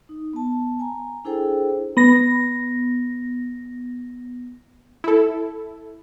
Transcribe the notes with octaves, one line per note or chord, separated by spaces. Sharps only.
D#4
B3 A5
G#5 A#5
D4 E4 G#4 A4 C5 G5
B3 A#6
E4 A4